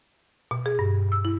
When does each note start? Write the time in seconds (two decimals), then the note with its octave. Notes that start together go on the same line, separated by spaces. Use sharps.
0.51 B2
0.66 G#4
0.79 G2
1.12 E6
1.25 E4